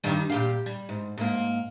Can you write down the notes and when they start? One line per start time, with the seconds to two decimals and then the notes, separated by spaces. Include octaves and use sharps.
0.04 G2 D#3 G3
0.30 A#2 G4 F5
0.66 G3
0.89 G#2
1.17 G#2 A#3